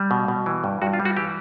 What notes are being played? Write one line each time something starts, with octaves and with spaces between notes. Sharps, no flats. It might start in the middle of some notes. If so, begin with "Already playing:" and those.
Already playing: G3
B2
B2
E3
G2
G2 F#4
F4
G3
F#4
E3 G4